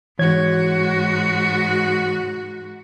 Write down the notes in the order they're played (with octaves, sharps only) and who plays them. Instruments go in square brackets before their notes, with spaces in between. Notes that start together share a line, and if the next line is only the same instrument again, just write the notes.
[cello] G#2 F#4 [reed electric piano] E3 C#5 G#6